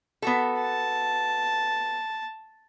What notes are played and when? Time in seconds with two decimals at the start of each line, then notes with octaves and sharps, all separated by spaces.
0.22 B3 F#4 A4
0.62 A5